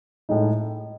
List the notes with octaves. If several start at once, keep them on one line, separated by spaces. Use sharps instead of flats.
A2 G#3 D#4